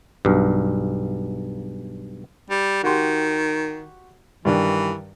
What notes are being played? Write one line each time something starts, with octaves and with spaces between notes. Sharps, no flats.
B1 G2
G3
D#3 F#4 G4 C6
G2 D#3 E3 D4